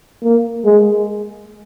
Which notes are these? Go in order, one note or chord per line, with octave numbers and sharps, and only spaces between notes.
A#3
G#3